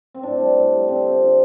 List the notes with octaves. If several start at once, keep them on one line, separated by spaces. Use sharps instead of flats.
C4
A2 D4
G3
A2
G3
D3 C4
F3 A3
D3